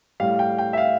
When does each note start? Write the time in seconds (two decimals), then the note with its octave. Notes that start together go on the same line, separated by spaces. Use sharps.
0.20 A2 G3 F5
0.39 G5
0.58 G5
0.73 E5
0.78 F5